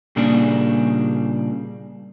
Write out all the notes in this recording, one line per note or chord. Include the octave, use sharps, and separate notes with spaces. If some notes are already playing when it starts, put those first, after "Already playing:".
A#2 C#3 G3 A#3 D4 G#4